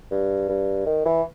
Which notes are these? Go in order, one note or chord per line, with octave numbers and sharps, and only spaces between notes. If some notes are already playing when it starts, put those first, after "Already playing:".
G2
G2
D#3
E3